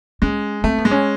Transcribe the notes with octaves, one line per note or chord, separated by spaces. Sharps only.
G#3 C#4
A3 C4
B3
G#3
C#4